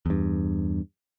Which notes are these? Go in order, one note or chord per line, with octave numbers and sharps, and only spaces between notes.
E2 G2